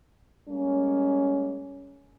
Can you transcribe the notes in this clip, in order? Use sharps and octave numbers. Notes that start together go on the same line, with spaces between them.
G3 G#3 A#3 C#4